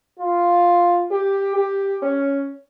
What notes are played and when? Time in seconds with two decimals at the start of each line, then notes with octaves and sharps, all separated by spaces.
0.19 F4
1.11 G4
1.56 G4
2.02 C#4